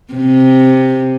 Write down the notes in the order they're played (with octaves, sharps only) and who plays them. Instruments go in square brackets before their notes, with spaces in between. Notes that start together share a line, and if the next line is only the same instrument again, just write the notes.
[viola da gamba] C3